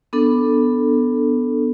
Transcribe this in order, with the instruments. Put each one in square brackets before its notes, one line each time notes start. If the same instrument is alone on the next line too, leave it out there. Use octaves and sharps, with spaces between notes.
[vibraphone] B3 D4 A4